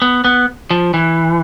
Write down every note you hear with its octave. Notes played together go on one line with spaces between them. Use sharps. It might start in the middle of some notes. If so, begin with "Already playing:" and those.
B3
B3
F3
E3